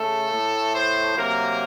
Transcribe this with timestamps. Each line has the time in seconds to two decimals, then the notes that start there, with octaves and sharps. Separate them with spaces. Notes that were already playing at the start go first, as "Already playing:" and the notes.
Already playing: C#3 A3 A4
0.30 A2 A3
0.73 C5
1.16 C3 F#3 A#3 A#4